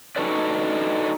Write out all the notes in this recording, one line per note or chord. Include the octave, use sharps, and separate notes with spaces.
D4 D#4 F#4 A4 B4 D5